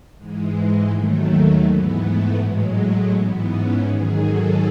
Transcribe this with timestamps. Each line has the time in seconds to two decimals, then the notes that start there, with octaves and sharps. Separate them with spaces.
0.18 G#2 E3 G#3
0.91 D#2 D#3 F#3 A3
1.64 G#2 E3 B3
2.01 A3
2.37 A2 F#3 G#3
2.74 A3
3.10 G#2 E3 B3
3.47 C#4
3.83 G#2 D#3 F#3 G#4
4.20 A4